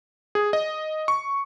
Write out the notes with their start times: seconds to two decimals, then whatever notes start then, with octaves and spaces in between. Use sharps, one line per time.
0.35 G#4
0.53 D#5
1.08 C#6